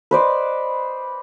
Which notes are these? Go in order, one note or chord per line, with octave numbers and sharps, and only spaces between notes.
B4 C5 D5 D#5